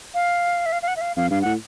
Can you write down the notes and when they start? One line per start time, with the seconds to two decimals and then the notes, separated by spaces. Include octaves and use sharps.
0.14 F5
0.66 E5
0.72 F5
0.82 F5
0.88 F#5
0.96 E5
1.01 F5
1.16 F2 F5
1.30 G2 F5
1.42 A2 F#5